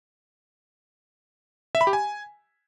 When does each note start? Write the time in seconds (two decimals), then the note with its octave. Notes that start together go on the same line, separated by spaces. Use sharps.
1.75 E5
1.81 B5
1.87 G4
1.93 G#5